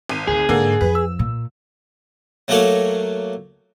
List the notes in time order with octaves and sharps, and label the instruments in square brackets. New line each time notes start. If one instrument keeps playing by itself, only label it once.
[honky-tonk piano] G#1 D#7
[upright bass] D2 [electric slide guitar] G#4
[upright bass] G#2 [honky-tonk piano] D3 A#3
[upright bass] F2 [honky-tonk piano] B4
[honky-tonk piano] E6
[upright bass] A#2
[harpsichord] F#3 A3 A#3 F#4 A4 C#5